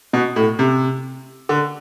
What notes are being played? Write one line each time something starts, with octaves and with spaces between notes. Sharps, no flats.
B2
A2
C3
D3